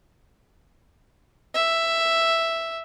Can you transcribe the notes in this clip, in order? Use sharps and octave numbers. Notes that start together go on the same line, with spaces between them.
E5